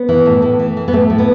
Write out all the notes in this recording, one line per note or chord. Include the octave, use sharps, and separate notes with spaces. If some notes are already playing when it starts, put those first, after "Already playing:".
Already playing: B3
E3
A2
A2
E3
E3
B3
A2 A3
A2
B3